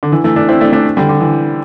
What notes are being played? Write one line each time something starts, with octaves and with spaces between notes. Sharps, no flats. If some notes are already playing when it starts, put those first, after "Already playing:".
D3
E3
E3 A3
A3 D4
C4 E4
A3 D4
A3 D4
D3 G3
D3
E3